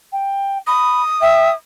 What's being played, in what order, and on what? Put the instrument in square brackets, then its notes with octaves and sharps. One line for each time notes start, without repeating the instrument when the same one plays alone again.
[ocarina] G5
[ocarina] B5 [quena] D#6
[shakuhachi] E5 [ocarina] G5